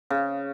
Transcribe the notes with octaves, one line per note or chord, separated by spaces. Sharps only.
C#3